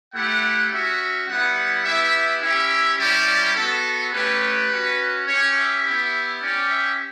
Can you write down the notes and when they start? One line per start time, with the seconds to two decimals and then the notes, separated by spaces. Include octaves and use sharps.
0.14 A3 E4 G4 F#5
0.71 C#4 F#4 E5
1.28 G3 B3 E4 F#5
1.85 B3 E4 G4 E5
2.41 C#4 E4 G4 E5
2.99 G3 C#4 E4 G4 D5
3.56 B3 F#4 A4
4.13 A3 C#4 G4 B4
4.70 C#4 F#4
5.27 C#4 G4 C#5
5.55 E5
5.84 B3 E4 G4
6.41 C#4 G4 D5
6.69 E5